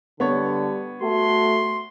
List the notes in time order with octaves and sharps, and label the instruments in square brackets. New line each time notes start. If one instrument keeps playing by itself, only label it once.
[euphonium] D3 [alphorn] G3 [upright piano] B3 C#5
[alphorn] A3 [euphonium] F#4 [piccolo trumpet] C6